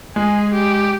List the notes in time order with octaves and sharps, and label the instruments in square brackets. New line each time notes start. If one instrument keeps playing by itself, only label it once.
[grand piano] G#3 [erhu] G#4
[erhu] G4